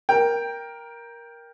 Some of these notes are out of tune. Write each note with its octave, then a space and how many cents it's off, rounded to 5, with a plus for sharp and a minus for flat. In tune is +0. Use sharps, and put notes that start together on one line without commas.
A#4 +10 G5 +10